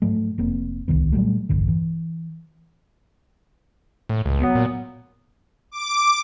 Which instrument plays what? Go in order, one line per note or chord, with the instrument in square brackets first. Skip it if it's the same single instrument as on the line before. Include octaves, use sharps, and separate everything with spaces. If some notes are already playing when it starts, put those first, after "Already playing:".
[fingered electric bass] G#2 F3 F#3 A3
F1 A#3 C4
D1 C2 D#3 B3
A#2 F#3 G3 A3
E1 A#1 G2 D3
E3
[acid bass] A2
C#2
[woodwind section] F#3 B3
[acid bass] A#2
[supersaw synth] D6